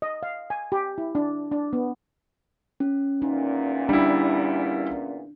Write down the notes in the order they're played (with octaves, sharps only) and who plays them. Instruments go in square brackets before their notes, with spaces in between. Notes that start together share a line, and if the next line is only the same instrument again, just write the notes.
[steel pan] D#5
F5
G#5
G4
E4
D4
D4
B3
[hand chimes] C#4
[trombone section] E2 A#2 [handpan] D#4
[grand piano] G3 E4 [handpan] D4